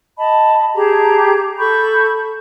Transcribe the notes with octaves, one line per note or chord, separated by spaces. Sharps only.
D#5 A5 B5
G4 G#4 A5 A#5
A4 B5 C#6 G6